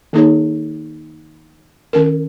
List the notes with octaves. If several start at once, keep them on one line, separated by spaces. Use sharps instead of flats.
D#3 A#3 D#4 G#4 C#5
D#3 C#4 A#4